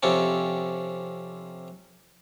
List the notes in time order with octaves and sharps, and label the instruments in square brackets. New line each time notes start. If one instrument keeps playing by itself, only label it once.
[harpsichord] F2 C3 C#4 D4